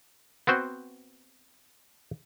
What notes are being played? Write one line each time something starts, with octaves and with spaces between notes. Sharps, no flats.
B3 C4 F#4 C5